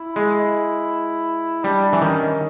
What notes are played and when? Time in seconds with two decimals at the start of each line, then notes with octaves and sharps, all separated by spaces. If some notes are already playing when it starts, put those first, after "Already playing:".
Already playing: E4
0.16 G#3
1.64 G3 D4
1.93 E3
2.01 D#3 C#4